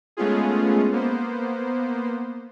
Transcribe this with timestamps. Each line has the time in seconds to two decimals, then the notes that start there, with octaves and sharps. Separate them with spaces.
0.17 G#3 A3 B3 C#4 F4 G#4
0.92 A#3 B3 C5